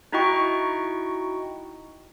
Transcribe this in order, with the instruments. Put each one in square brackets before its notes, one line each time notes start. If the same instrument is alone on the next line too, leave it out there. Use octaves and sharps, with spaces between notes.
[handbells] D#4 E4 F#4 D#5 G5 C#6